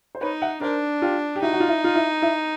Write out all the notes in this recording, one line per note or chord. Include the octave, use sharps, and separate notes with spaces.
C5
D#4 B4 C#5
E5 F#5
D4 A#4 C5
F4 G4
G4
D#4 E4 F#4
F#4
F4
E4
F4
E4
E4